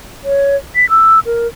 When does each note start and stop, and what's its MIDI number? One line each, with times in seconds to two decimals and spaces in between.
0.24 0.56 73
0.75 0.89 95
0.89 1.20 88
1.26 1.47 70